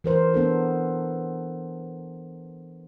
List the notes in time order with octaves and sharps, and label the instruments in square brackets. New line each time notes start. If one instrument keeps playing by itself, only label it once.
[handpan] E3 A#4 C5
B3 D4 A4